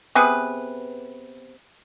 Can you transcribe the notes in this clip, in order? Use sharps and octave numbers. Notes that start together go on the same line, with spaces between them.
C3 B3 G#4 B4